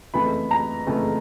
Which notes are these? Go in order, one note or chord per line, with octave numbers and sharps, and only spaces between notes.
F#1 F2 C#3 E3 A3 B5
A#5
F#1 F2 C#3 E3 A3